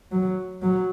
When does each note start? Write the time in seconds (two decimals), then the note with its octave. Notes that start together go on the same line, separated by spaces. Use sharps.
0.11 F#3
0.62 F#3